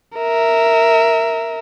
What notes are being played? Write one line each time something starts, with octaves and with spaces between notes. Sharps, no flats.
A#4 E5